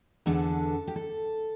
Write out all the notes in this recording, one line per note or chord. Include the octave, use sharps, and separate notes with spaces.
E2 D3 B3 D4 A4
G4
A4